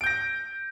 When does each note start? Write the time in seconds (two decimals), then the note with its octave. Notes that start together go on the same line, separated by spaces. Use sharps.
0.01 D7
0.04 G6
0.06 A#6